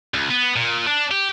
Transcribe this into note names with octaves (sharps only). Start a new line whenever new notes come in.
C#2
B3
A#2
D4
G4